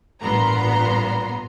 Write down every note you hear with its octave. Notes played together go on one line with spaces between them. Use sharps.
A1 G2 A#2 B3 A#5 C6